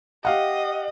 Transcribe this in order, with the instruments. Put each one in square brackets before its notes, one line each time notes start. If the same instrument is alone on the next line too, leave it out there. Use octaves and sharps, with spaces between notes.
[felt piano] G4 F5 F#5 [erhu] D#5